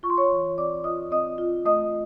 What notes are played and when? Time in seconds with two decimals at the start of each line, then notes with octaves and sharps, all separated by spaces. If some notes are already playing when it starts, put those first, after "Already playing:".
0.03 F4 C#6
0.10 C6
0.17 C#5 C#6
0.30 E3
0.58 C4 D5 D6
0.84 F4 D#5 D#6
1.11 C4 D#5 D#6
1.38 F4
1.65 A3 D#5 D#6